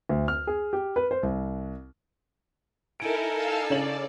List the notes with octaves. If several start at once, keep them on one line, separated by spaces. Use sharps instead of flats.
D2
F6
G#4
G4
B4
C5
C2
D#4 E4 A4 A#4 G#5 D7
F5 A5 E6
C#3 C#5 D5 F#7